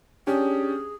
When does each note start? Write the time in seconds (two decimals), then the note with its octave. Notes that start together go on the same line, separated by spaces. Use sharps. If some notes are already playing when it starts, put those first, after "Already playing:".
0.27 C#4 D4 G4 G#4